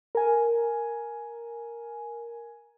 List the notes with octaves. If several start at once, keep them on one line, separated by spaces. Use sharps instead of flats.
A#4 G#5